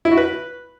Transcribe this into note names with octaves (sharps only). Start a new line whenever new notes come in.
E4
F#4
B4